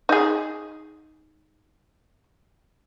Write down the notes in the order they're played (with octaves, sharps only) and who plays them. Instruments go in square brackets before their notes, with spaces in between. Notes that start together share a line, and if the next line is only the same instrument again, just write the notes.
[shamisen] D#4 G#4